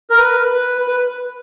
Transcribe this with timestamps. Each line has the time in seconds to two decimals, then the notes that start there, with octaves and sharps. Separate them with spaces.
0.10 A#4
0.19 B4
0.53 B4
0.88 B4